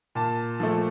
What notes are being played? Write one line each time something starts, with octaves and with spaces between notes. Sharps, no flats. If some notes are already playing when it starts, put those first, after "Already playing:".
A#2 A5
F3 A3